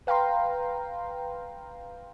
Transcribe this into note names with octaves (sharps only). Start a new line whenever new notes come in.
B4 F5 G5 A#5 C6